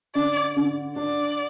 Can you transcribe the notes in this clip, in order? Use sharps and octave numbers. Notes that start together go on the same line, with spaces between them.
D3 D5
D3
D4 D5